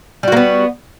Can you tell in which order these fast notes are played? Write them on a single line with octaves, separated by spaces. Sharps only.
G3 F#4 A#3 B3